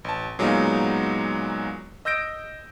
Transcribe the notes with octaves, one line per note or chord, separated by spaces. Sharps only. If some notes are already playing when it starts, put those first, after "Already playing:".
A1 A5
A#2 F#3 G#3 B3 D#4 F4
D#5 E6 G6 A#6 D7